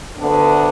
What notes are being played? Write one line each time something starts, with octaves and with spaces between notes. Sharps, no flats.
D2 D3 B3 D4